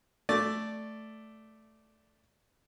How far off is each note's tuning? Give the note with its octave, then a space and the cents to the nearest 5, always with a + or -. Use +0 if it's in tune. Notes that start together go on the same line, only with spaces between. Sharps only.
A3 +0 D5 +0